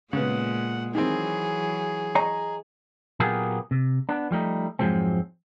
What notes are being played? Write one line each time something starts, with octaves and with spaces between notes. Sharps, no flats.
A#2 C#3 G#3 B3 F#5
D#3 E3 F#3 C4 G#4
C#5 D#5 A#5
A#2 F#3 A#3 B3 G4 G#4
C3
B3 D4
F3 G3 A3 D#4
F2 G#2 F3 F#3 G#3 C4